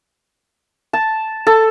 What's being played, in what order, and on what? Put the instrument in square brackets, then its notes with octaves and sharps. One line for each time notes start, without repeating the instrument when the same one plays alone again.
[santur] A5
A4